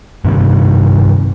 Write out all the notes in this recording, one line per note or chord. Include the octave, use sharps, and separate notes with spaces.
G2 C3 D#3